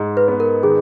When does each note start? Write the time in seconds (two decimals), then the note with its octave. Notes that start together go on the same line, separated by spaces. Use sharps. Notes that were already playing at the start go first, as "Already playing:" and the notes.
Already playing: G#2
0.17 B4
0.28 B3
0.40 A#4
0.63 D#3 G#4